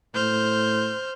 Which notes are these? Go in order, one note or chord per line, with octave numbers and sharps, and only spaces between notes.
A2 C5 F6 G6